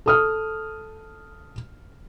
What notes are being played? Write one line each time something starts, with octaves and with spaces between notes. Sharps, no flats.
A4 D#6 F6